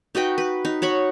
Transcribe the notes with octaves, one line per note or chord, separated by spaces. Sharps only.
D#4 F#4 B4 G5
B4
D#4
F#4 C#5 B5 C#6